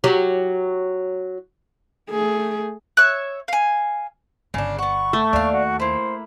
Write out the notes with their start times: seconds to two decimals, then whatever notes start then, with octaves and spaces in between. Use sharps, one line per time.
0.04 F#3 G4
2.10 A3 G#4
2.97 C#5 E5 F#6
3.48 F5 G#5
4.54 G1 C#3 D4
4.79 B3 F#5 C#6
5.13 A3
5.33 D#2 D4 F5
5.52 F#4
5.80 A#3 E4 C5